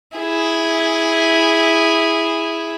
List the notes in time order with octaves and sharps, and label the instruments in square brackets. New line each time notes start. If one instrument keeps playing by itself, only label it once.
[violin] E4 G#4